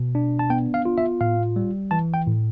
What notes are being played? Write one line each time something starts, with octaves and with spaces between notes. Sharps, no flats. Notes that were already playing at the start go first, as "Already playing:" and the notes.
Already playing: B2
D4
A5
B3 G5
F5
F4
E5
A2 F5
G3
E3 A5
G5
A2